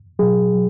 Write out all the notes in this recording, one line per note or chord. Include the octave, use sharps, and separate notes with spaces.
B2 F#3 G#4
F#3